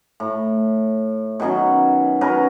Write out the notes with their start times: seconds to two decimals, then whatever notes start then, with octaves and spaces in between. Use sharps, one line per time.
0.20 A2
1.40 B2 D#3 F#3 C#4
2.21 F#3 C#4 A#4 B4